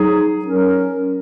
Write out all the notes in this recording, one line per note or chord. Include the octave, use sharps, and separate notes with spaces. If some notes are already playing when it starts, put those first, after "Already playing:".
Already playing: F#3 D#4 G#4
F#3 C#4 A#4 C#5